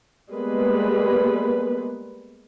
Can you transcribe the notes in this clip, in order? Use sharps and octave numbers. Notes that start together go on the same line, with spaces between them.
G3 G#3 A#3 B3 B4